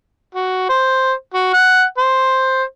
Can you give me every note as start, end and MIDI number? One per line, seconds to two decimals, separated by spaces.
0.35 0.68 66
0.69 1.12 72
1.34 1.51 66
1.53 1.84 78
1.98 2.63 72